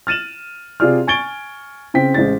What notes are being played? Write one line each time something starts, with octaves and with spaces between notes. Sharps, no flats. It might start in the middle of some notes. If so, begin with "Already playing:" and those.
F6 A6 D#7 E7 F#7
C3 F4 G#4 D5 F6
G#5 C#6 G#6 A6 D7 G7
C#3 C4 G5 B6
A1 G#3 C5 A6